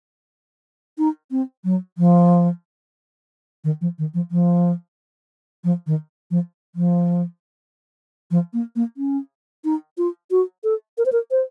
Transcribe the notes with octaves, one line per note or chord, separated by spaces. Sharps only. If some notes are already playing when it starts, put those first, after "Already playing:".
D#4
C4
F#3
F3
D#3
F3
D#3
F3
F3
F3
D#3
F3
F3
F3
A#3
A#3
C#4
D#4
F4
F#4
A4
A#4
C5
A#4
C5